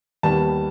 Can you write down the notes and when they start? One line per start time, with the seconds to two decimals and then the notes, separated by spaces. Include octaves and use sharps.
0.23 D#2 D#3 G3 B3 A5